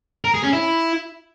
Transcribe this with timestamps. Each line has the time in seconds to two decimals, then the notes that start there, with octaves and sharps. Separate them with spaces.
0.25 A#4
0.34 G#4
0.44 C#4
0.53 E4